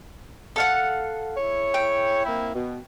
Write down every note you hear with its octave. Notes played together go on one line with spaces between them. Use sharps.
A4 F5 F#5
E4 G#4 C#5
G5
A#3 C4 E4
B2